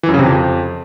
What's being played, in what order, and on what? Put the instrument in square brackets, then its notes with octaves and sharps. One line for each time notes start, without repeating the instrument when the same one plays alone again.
[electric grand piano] E3
F#2
C#3
C3
F2